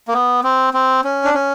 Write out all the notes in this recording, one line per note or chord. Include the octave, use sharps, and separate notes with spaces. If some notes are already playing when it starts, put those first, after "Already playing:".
A#3
B3
C4
C4
C#4
D4
C#4